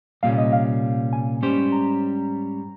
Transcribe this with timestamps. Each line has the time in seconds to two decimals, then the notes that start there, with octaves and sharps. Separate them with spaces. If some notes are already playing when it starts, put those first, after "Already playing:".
0.23 C2 A#2 G3 C#4 F5
0.38 D#5
0.53 F5
1.13 G#5
1.42 G#2 G3 C#4 G4 C5
1.72 A#5